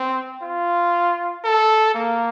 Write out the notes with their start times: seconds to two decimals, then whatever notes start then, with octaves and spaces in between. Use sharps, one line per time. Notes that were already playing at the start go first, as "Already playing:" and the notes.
Already playing: C4
0.42 F4
1.44 A4
1.95 A#3